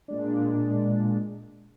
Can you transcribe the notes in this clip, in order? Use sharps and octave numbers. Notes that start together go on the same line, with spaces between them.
A#2 G#3 D4